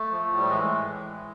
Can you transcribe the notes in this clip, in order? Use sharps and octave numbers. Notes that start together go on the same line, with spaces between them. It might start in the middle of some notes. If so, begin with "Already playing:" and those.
Already playing: A3
F3
A2
G3
E3 G#3
A2
E3
A2